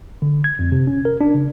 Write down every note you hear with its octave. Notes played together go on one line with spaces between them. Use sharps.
D3
G#6
F2
C3
C#4
A#4
D4
C#3